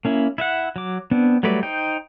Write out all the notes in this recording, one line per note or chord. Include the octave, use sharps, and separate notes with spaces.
A#3 C#4 E4
E4 E5 F#5
F#3 D6
B3 C4 D4
F#3 G3 A3 B4 D5
D#4 C5 G5